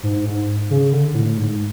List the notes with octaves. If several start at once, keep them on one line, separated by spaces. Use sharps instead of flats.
G#2
G#2
C#3
D3
A2
G#2